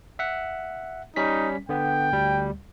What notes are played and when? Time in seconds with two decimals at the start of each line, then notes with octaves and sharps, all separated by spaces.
0.19 E5 F#5
1.16 G3 C#4 D#4 B6
1.69 D3 B3 G5
2.13 D2 G3